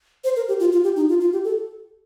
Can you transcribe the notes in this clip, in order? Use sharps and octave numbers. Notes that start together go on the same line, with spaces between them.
C5
A#4
G4
F4
F4
G4
D#4
F4
F4
G4
A4